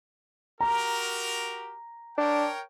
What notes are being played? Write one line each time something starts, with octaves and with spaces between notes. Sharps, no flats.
F#4 G4 A#4 A#5
D4 A#4 C#5 G5